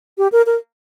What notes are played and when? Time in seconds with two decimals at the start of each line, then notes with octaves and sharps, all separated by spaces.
0.18 G4
0.32 A#4
0.46 A#4